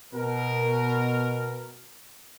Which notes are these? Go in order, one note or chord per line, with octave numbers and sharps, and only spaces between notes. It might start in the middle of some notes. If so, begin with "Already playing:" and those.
B2 A#4